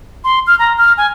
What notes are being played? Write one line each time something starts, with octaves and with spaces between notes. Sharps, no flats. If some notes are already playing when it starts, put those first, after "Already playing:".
C6
F6
A#5
F6
G#5